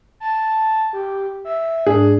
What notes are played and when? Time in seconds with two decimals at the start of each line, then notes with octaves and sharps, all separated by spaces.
0.20 A5
0.93 G4
1.45 E5
1.87 G#2 D4 G#4